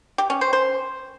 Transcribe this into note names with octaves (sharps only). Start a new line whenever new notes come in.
G4
C#4
C5
C5